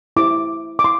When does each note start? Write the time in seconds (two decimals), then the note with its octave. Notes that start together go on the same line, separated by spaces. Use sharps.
0.17 E4 G4 C5 D6
0.79 D6
0.84 E4 C6